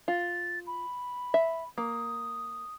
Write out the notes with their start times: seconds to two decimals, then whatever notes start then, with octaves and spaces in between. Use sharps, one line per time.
0.08 F4 A6
0.67 B5
1.34 E5
1.78 A#3 D#6